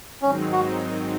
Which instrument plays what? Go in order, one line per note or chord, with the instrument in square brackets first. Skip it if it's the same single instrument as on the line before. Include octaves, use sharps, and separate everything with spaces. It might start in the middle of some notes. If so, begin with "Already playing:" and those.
[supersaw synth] G#2 D#3 F#3 C4 D#4 [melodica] C#4
[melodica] F#4